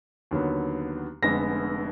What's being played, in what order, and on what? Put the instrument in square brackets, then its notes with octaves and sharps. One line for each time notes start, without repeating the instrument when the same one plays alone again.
[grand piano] D#2 D3 F#3 B3
F1 F2 D3 G#3 B3 A#6